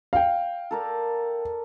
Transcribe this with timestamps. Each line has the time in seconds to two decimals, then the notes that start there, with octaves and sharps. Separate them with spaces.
0.13 F5 G5
0.71 A4 A#4 D5